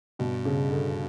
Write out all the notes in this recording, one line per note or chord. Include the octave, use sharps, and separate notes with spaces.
G2 B2
C#3
D3